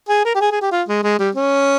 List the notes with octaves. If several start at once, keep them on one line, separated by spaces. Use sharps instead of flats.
G#4
A#4
G4
G#4
G#4
G4
F4
G#3
G#3
G3
C#4